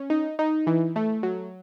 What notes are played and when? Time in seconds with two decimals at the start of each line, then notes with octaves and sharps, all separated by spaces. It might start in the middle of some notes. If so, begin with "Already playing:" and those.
Already playing: C#4
0.10 D#4
0.39 D#4
0.67 E3
0.96 A3
1.23 F#3